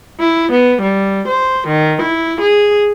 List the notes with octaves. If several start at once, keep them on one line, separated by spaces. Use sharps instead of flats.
E4
B3
G3
C5
D#3
E4
G#4